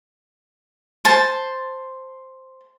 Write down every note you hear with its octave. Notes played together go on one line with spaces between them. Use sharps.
C5 A5